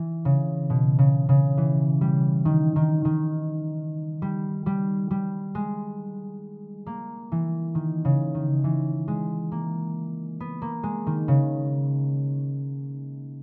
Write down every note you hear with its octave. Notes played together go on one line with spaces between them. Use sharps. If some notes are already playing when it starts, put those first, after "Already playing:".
Already playing: E3
C#3
B2
C#3
C#3
E3
G3
D#3
D#3
D#3
G3
G3
G3
G#3
A#3
E3
D#3
C#3
D#3
E3
G#3
A#3
B3
A#3
G#3
D#3
C#3